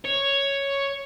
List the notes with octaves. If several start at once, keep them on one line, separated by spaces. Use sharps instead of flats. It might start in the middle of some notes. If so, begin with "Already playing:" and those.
C#5